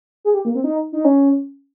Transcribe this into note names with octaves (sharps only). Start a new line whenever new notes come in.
G#4
G4
A#3
C4
D#4
D#4
C#4